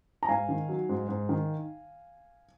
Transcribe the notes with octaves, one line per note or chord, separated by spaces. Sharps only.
A#5
G#2 F5 G#5
D#3
F#3
G#2
G#2
D#3